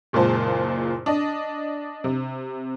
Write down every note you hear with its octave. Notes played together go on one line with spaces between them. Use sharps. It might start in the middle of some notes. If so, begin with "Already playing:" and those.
F#1 A#2 G#3 F4 C5 A5
D4 D#5
C3